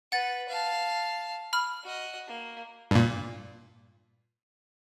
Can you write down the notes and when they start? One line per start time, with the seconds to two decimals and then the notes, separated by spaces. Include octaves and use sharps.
0.12 B4 F#5 A6
0.49 F5 A5
1.53 B5 F6
1.83 F#4 D#5
2.28 A#3
2.91 G2 A#2